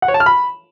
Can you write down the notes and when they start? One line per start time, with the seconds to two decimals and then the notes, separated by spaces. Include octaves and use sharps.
0.02 F#5
0.08 C#5
0.14 A5
0.20 F6
0.26 B5